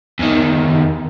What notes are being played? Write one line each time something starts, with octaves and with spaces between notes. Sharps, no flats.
E2 D#3